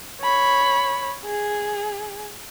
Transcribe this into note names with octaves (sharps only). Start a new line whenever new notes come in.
C#5 B5
G#4